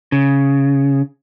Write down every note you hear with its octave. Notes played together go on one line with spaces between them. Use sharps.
C#3